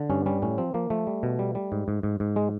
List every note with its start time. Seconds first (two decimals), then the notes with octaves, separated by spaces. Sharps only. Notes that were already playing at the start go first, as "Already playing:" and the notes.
Already playing: D3
0.10 G2 C#4
0.26 G3 C#4
0.42 A2 C#4
0.58 F3 C4
0.74 F3 A#3
0.90 F3 A3
1.07 G3
1.23 B2
1.39 G3
1.55 G3
1.72 G#2
1.88 G#2
2.03 G#2
2.20 G#2
2.36 G#3